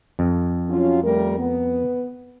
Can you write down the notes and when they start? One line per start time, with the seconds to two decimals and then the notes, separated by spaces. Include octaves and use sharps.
0.19 F2
0.69 F#3 C#4 F4
1.03 G3 A3 A#4
1.38 B3